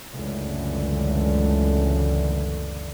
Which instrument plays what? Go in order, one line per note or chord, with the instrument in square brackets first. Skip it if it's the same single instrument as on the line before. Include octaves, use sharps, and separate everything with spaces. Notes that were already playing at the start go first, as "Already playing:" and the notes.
[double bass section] C#2 F#2 D3 E3 A3